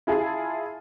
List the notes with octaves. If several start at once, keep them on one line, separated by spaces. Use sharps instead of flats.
E4 F4 G#4 A5